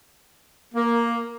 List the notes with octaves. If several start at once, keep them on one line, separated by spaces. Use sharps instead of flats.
A#3